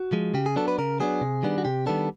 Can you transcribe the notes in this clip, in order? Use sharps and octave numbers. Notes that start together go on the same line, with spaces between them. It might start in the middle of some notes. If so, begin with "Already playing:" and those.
Already playing: F#4
F3 G#3
C#3 G4
G#4
F#3 B3 D4 A4
B4
C#3 A#4
F#3 B3 D4 G#4
C3
D#3 G3 B3 D4
F#4
C3 G4
D#3 G3 B3 D4 A4